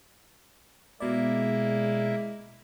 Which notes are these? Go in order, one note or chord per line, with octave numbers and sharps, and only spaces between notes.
B2 G#3 A#3 E4 D5